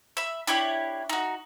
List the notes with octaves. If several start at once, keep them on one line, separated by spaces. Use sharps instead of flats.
E5 B5
D4 E4 G4 C#5
D#4 F#4